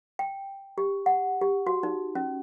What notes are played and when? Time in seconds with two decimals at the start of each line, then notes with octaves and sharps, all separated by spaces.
0.19 G5
0.78 G4
1.06 F#5
1.41 G4
1.67 F#4
1.83 D#4
2.15 C#4